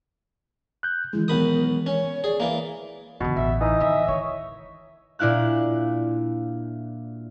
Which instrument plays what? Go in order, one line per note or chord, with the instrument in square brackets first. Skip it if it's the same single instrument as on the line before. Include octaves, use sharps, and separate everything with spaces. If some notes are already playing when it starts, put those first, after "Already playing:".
[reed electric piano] F#6 G6
[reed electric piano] D#3 E3 G#3 [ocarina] E4
[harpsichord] B1 B5 D#6 [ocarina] A#4
[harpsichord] C#4 [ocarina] C#5
[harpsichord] G#4 [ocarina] D5
[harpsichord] E3 A#3
[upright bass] E2 D3 [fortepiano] B2
[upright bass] A1 [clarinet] E5
[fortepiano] E3 [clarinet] D#4 [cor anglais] D#5
[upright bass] D#3 [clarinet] E5
[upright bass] D#3 [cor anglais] C#5
[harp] A#2 D4 E4 F5 F#6